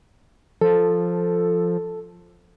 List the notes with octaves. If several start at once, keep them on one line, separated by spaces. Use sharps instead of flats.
F3 A4